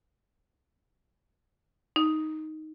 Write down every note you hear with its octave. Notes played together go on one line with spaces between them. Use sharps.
D#4